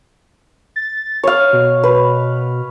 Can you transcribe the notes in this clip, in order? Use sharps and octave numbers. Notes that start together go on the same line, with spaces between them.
A6
C#5 F5
B2
B4